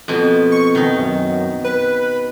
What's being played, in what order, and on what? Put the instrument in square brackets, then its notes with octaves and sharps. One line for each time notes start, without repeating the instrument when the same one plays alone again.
[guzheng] F2 B2
[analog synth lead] C#6
[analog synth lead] B2 [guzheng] D#3 D#4
[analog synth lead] F#2
B4